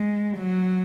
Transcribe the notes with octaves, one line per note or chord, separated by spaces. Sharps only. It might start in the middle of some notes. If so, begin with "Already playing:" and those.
Already playing: G#3
F#3